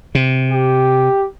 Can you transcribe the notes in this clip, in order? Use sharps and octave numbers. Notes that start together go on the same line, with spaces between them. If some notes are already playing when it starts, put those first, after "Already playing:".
C3
G4